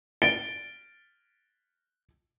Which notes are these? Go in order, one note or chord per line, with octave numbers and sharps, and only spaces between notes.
A6 D7 G7